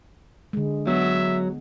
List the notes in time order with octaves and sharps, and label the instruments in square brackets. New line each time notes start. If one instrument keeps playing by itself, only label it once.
[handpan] D3 G#3
[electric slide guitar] F#3 [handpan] B3 [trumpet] E5